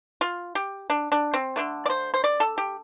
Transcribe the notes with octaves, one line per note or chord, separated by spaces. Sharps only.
F4
G4
D4
D4
C4
D3 A3 D4
D5
C5
C5
D5
A4
G4